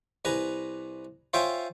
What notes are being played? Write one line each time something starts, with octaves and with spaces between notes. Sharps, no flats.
C2 B4 G#5 A#5
F4 C5 C#5 E5 G5 G#5